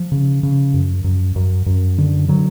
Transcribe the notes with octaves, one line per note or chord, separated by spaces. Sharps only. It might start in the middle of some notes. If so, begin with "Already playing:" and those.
Already playing: F3
C#3
C#3
F#2
F#2
F#2
F#2
D3
D3 F#3